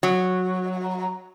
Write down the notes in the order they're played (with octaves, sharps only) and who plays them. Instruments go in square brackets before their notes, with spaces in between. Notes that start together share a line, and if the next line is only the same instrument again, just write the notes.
[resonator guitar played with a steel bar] F#3